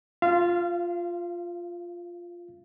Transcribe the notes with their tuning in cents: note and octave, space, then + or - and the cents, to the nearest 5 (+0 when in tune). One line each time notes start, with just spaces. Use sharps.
F4 +0 F5 -30